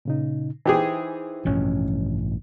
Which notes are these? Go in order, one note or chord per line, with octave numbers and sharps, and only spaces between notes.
A#2 C#3 D#4
E3 D#4 E4 G4 G#4 C5
A1 G2 B2 F3 C#4